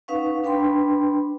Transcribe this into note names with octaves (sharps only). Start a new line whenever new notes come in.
C#4 D#4 B4 F5 F#5 C#6
D4 B4 G5 B5 C6